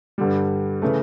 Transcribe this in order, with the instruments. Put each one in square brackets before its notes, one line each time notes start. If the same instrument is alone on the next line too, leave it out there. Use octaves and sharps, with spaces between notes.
[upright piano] G2 D3 G3
C#3 E3 A3